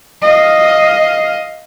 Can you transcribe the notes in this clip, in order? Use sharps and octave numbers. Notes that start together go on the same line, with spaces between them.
D#5 F5